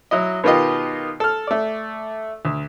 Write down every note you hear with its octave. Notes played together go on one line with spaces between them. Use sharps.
F#3 E4 D#5
B2 D#3 B3 F4 G4 D#5
A4 F6
A3 D5
D2